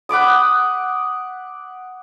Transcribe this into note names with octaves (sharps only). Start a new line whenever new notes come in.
F#5 B5 D6 D#6